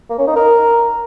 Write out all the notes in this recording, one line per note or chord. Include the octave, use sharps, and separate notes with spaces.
A#3
C#4
D#4
A#4